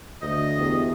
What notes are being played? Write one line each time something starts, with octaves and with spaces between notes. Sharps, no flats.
D2 D#5
E2 F#4 G4